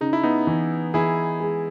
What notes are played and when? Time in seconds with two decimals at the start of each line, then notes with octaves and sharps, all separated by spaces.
0.01 C#3 D#4
0.13 E4
0.23 B3 D#4
0.47 E3
0.94 E3 E4 G#4
1.40 G#3